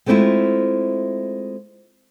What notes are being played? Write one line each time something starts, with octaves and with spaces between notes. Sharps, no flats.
G#3 A3 C4 C#4 E4 F4